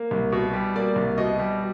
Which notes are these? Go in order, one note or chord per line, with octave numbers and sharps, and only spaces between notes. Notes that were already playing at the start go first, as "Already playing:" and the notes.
Already playing: A#3
C2
B2
G3
A#3 D5
C2
B2 D#5
G3